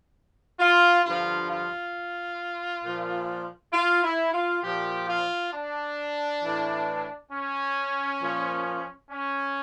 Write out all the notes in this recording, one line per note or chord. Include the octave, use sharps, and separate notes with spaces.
F4
G2 D3 F3 F4
F4
A#2 F3
F4
E4
F4
A#2 F3 G4
F4
D4
A2 E3
C#4
A#2 F3
C#4